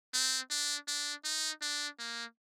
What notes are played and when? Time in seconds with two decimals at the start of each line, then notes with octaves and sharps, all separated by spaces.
0.14 C4
0.51 D4
0.88 D4
1.25 D#4
1.62 D4
1.99 A#3